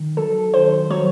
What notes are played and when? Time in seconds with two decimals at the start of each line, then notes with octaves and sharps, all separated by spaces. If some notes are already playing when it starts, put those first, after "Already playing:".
Already playing: D#3
0.17 F#3 A4
0.54 D#3 C5
0.90 F#3 C#5